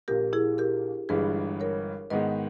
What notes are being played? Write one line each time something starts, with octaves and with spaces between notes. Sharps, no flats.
A#1 A#2 A#3 G4 A#4
E4 G#4
G4 A#4
G1 G2 E3 G#3 G#4 B4
A#4 C#5
G#2 D#3 G#3 B3 B4 D#5